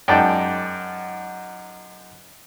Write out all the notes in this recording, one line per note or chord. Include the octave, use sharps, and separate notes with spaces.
F#2 G#3 D#4 D5 G5 A5